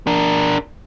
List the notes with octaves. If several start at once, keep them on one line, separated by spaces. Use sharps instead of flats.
D4 A#4